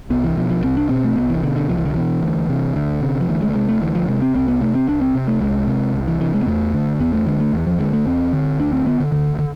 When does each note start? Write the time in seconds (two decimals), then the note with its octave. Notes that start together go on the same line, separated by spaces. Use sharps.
0.10 C2 B3
0.24 E3
0.37 B2 F3
0.50 F3
0.63 C2 C4
0.77 D4
0.89 B2 C4
1.04 A3
1.17 C2 B3
1.30 E3
1.43 B2 D3
1.56 D3
1.69 C2 F3
1.77 E3
1.85 D3
1.94 B2 E3
2.23 D2
2.49 C3
2.76 D2 D3
3.02 C3
3.21 F3
3.29 D2 E3
3.42 G#3
3.50 A3
3.55 C3 G#3
3.69 A3
3.82 D2 E3
3.95 F3
4.08 C3 G#3
4.22 C4
4.35 C2 C4
4.48 B3
4.61 C3 A3
4.75 C4
4.88 C2 D4
5.01 C4
5.15 C3
5.28 A3
5.41 C2 G#3
5.67 C3
5.94 C2
6.08 E3
6.21 C3 E3
6.34 G#3
6.43 B3
6.47 E2 A3
6.74 D3
7.00 E2 B3
7.13 A3
7.27 D3 G#3
7.40 A3
7.53 E2 E3
7.67 F3
7.79 D3 G#3
7.93 A3
8.06 E2 C4
8.33 D3
8.59 D2 D4
8.73 C4
8.86 D3 B3
9.00 D3
9.12 D2 D3
9.39 D3